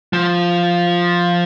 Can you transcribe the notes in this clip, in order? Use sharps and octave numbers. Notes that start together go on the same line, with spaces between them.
F3